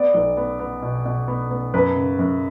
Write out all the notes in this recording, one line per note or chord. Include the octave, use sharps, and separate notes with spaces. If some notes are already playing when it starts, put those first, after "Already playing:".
Already playing: B3 D5
B1
B3
B3
B2
B2
B3
B3
F#2 B4
C#3
F#2